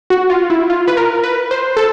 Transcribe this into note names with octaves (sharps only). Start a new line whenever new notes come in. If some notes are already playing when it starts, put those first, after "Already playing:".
F#4
F4
E4
F4
B4
A#4
B4
C5
A4